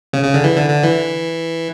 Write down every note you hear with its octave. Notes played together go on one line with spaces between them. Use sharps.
C#3
C#3
D3
E3
D3
D3
E3